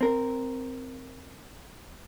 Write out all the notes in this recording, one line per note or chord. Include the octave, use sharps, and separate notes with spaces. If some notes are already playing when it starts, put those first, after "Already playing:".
C4 A#4